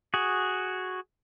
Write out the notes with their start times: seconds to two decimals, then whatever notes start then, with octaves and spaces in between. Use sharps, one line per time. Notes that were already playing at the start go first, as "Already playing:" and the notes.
0.14 F#4 G#4